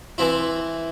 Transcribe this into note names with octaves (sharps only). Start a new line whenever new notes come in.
E3 C4 E4